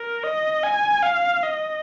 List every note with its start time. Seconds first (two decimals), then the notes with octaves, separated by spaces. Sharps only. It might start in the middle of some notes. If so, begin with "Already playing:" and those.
Already playing: A#4
0.24 D#5
0.64 G#5
1.03 F5
1.43 D#5